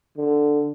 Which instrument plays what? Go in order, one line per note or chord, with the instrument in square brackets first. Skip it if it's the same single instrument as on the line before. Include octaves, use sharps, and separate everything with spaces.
[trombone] D3